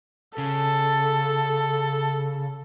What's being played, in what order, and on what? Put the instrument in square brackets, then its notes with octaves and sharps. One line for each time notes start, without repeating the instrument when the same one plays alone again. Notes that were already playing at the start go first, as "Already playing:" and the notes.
[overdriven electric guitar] C#3 [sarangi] A4